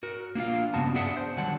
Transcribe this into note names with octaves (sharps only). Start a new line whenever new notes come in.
F#4 A#4
A#3 D4 F4 F5
G2 C#3 B3 F#4 A5
B3 D4 G#4 E5 F#5
C5
D3 D#3 F#3 G3 F#5 A5